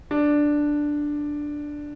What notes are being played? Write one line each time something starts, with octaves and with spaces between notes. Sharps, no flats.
D4